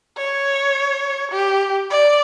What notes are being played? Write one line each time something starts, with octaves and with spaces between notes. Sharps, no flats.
C#5
G4
D5